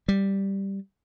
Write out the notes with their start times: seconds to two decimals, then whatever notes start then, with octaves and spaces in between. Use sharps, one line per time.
0.08 G3